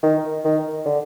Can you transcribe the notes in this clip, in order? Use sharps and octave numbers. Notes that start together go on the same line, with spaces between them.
D#3
D#3
D3